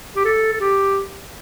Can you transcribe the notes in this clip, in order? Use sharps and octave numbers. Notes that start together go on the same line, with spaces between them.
G4
A4
A4
G4